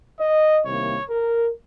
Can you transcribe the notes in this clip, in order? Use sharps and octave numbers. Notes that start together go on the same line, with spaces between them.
D#5
C2 C3 D#3 A#3 C#5
A#4